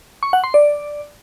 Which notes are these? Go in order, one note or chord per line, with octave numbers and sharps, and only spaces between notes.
C#6
F#5
C6
D5